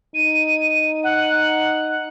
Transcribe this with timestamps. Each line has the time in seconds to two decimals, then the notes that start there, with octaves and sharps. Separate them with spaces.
0.15 D#4 D#7
1.04 F#5